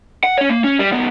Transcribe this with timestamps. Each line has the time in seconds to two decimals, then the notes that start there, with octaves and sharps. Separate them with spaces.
0.24 F#5
0.38 C#4 C#5
0.50 A#3
0.64 C#4
0.79 G3
0.92 C2 B3